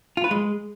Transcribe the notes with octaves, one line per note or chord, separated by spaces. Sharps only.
F4
B4
G#3